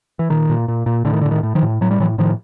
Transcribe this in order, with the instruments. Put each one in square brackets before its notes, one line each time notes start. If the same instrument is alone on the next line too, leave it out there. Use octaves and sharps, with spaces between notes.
[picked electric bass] E3
A#2 D#3
A#2
A#2
A#2
A2 D3
D#3
D3
A2
D#3
A2
D#3 F3
A2
A2 F#3
G3
A2 E3 F#3
A2 D#3 F3